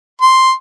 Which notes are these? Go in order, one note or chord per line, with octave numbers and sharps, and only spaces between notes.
C6